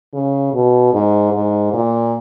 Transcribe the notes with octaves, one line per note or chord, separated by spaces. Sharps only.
C#3
B2
G#2
G#2
A#2